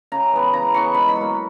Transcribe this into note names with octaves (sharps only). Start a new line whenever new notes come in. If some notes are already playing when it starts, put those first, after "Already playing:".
C#3 A#5
E3 B3
C#3 A#5
E3 B3 C#6
G#2 B5
B5
F#3
A#3